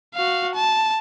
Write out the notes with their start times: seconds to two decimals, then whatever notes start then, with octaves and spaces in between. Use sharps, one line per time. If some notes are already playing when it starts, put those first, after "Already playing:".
0.15 F#4 F5
0.55 A5